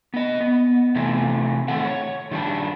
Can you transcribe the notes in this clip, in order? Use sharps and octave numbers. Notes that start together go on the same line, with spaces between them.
B3 D#5
B3
C3 E3 A3
A2 D#3 C4 A4 F#5
C#5
D#3 G3 D4